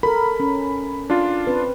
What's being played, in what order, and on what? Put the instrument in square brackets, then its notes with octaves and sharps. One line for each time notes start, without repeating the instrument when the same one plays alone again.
[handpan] A4 A#4 [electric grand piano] B5
[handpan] C#4
[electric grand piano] D4 F4
[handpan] C4 B4